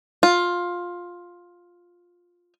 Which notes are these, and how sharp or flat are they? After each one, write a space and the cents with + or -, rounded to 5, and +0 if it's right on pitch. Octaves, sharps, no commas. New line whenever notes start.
F4 +10